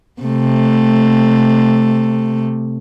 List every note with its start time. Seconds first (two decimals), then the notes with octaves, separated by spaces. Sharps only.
0.22 C3 A3